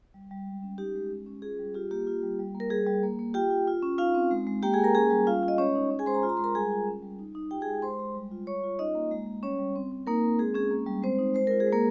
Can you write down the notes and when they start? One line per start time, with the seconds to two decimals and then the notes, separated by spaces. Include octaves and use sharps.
0.14 G3
0.31 G3
0.46 G#3
0.63 C#4
0.78 D#4 G4
0.95 G#3
1.10 C#4
1.26 C#4
1.42 F4 G#4
1.59 G3
1.75 F4 G4
1.91 A#3 G4
2.07 F4
2.23 G3
2.39 G3
2.55 A#3
2.60 A#4
2.70 G3 G#4
2.87 G3
3.03 A#3
3.19 A#3
3.34 F4 G4 G5
3.50 F4
3.67 F4
3.83 C#4
3.98 D#4 F4 F5
4.14 C4
4.31 G#3
4.47 G#3
4.63 A#3 G4 G5
4.73 G#4 G#5
4.79 A#3
4.84 A#4 A#5
4.94 C#4 G#4 G#5
5.10 G3
5.27 C#4 F4 F5
5.43 F4
5.48 D#5
5.58 G#3 C#4 C#5
5.75 D#4
5.90 C#4
5.99 G#4 G#5
6.06 G#3 C5 C6
6.14 A#5
6.23 F4 C6
6.29 A#5
6.37 G#3 C6
6.44 A#4 A#5
6.55 G3 G#4 G#5
6.72 F4
6.87 C#4
7.03 G3
7.19 D#4
7.35 D#4
7.51 F4 G4 G5
7.61 G#4 G#5
7.67 G#3
7.82 G#3 C5 C6
7.99 G#3
8.15 G3
8.31 F4
8.47 G3 C#5 C#6
8.64 F4
8.79 C#4 D#4 D#5
8.95 A#3
9.11 G#3
9.27 G#3
9.43 G3 C#4 C#5
9.59 G3
9.76 C4
9.92 C4
10.07 A#3 D#4 A#4
10.24 C4
10.39 G#3 G#4
10.55 C#4 G#4
10.71 A#3
10.87 G3
11.03 G#3 C4 C5
11.19 D#4
11.35 G#3 C5
11.47 F4 A#4
11.60 G#4
11.67 G#3
11.72 A#3 A#4